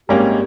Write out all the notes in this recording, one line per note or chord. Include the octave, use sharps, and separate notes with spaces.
G#1 G#2 G3 A#3 C#4 G4